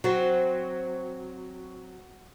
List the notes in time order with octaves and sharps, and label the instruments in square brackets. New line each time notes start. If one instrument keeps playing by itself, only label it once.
[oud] F#3 C4 [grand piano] F#4